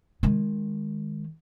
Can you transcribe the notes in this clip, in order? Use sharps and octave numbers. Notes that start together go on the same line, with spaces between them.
D#3 G#3